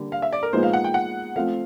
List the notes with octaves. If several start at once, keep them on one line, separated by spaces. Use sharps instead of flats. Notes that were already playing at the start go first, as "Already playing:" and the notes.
Already playing: D3 G3 A#3
F5
E5
D5
A#4
A#2 F3 G#3 B3 D#4 C5
F5
F#5
G5
F#5
F3 A3 C4 F5